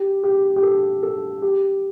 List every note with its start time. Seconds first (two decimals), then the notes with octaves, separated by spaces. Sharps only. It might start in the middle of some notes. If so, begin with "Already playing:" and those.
Already playing: G4
0.24 G4
0.56 G4
0.63 A4
1.03 A4
1.42 G4